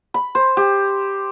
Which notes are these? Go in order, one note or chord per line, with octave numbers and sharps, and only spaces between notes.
B5
C5
G4